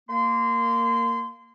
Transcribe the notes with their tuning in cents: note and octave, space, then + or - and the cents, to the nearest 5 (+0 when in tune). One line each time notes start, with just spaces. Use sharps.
A#3 -10 C6 -25